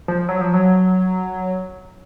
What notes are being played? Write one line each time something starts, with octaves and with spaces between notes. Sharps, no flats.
F3
F#3
F3
F#3